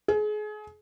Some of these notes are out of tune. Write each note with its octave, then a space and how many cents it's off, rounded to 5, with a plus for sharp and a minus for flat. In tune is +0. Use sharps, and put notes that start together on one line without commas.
G#4 +30